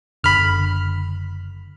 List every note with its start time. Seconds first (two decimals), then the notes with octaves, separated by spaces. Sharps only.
0.24 F#1 D3 B5 F6